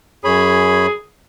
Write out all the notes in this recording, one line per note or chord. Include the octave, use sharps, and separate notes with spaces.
F#2 G#4 C#5 B5